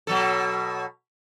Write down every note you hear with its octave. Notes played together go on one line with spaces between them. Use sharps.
B2 F#3 A4